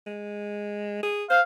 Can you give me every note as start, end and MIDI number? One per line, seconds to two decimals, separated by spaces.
0.06 1.01 56
1.03 1.24 68
1.30 1.41 72
1.30 1.42 77